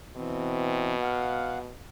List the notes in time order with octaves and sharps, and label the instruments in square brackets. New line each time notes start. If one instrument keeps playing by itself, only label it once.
[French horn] B2 [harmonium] E3 C4
[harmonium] F5 F#5